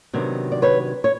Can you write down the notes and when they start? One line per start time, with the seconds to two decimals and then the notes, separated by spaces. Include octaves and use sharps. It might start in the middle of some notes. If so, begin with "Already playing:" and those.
0.13 C3 D#3 F#3 B3 D4
0.52 D5
0.62 B4 C#5
1.04 C#5